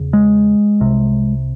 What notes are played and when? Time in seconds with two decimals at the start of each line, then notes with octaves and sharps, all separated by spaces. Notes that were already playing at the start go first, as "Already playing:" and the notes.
Already playing: E2 C#3
0.13 G#3
0.80 C2 C3